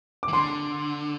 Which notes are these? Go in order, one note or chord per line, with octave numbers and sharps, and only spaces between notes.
D6
E3
D3 C6